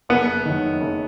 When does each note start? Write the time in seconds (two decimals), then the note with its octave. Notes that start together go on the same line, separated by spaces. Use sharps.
0.09 F#1 B3
0.45 F#2 D#3
0.81 F#1